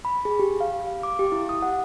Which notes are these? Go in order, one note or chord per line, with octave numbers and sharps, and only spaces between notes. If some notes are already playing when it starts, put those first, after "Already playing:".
B5
G#4
G4
F5
F5
D6
G4
E4
D#6
F#5